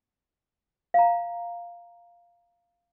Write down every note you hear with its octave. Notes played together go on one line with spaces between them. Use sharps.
F5 A#5